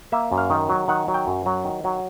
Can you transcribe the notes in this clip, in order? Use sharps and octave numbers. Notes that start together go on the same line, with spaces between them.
A#3 E5
F#2
F5
D#3
F#3
D#3 F#5
F#3
G5
F#2
F#3
D#3
F#3